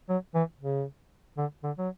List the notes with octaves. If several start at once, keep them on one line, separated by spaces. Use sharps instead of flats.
F#3
E3
C#3
D3
D3
F#3